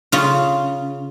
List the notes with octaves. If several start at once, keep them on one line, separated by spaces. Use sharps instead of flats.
C#3 F4